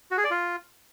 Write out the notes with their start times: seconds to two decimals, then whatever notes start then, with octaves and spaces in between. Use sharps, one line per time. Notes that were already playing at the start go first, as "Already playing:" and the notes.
0.11 F#4
0.18 G#4
0.24 D5
0.31 F4